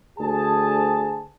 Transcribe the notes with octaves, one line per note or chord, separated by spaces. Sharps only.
D2 G#4 A5